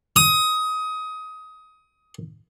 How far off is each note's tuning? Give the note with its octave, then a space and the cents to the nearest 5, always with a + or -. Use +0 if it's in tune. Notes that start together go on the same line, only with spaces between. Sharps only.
D#6 +20